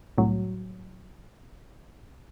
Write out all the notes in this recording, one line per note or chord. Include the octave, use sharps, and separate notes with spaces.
C2 A2 F#3